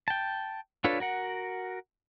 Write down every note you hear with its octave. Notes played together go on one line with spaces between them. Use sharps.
G5 A5
D4 F4 A4 B4 C#5
F#4 A#4 F#5